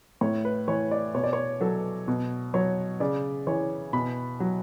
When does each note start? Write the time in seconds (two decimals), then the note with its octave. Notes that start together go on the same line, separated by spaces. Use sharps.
0.21 A2 C#5
0.45 B4
0.68 E3 C#5
0.91 D5
1.14 B2 C#5
1.24 D5
1.33 C#5
1.61 F#3 A4
2.08 B2
2.54 F#3 C#5
3.00 C#3 D5
3.47 E3 C#5
3.93 B2 B5
4.40 F#3